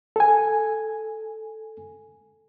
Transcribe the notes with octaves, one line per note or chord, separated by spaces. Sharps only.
A4 G#5